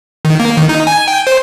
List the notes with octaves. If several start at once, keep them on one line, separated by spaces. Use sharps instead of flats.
D#3
A#3
D#3
D#4
G#5
G5
C5